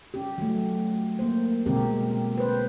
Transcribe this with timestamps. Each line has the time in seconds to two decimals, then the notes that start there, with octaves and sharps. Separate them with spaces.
0.14 C#4 G4
0.38 F#3 A3
1.19 A#3 C5
1.66 B2 D3 G#3 C4 G4 A#4
2.38 B4 C5